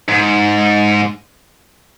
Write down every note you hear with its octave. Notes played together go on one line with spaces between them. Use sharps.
G#2